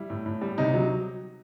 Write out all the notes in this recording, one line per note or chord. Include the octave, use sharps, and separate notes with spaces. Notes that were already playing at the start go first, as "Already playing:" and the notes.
Already playing: G3 E4
A2
A2
G3
C3 D#4
F#3